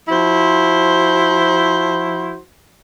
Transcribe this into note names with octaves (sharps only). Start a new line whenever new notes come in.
F3 E4 F#4 C5